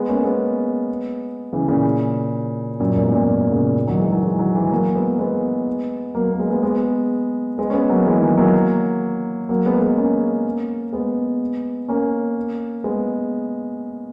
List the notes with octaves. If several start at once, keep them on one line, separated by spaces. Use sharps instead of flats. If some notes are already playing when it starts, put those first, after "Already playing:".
Already playing: G#3 B3
A#3 C#4
G#3 B3
C#3 E3
A#2 C#3
F#2 A#2
E2 G#2
F#2 A#2
A#2 C#3
D#3 F#3
E3 G#3
D#3 F#3
E3 G#3
D#3 F#3
E3 G#3
F#3 A#3
G#3 B3
G#3 B3
F#3 A#3
A#3
G#3 B3
G#3 B3
G#3 B3
G#3 B3
C#4
G#3 B3
F#3 A#3
E3 G#3
D#3 F#3
F#3 A#3
F#3 A#3
G#3 B3
G#3 B3
A#3 C#4
G#3 B3
A#3 C#4
G#3 B3